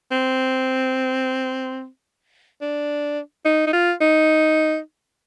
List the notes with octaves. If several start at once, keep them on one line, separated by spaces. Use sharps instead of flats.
C4
D4
D#4
D#4
F4
D#4